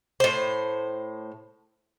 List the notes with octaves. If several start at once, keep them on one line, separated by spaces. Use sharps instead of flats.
A2 C5